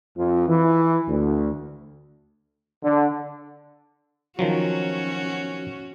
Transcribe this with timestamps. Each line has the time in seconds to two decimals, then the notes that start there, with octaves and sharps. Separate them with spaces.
0.17 F2
0.47 E3
1.09 D2
2.83 D3
4.39 D#3 F3 F#3 C#4 F#4